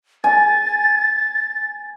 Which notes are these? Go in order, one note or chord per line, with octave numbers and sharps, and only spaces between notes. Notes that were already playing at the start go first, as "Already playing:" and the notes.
G#5 A6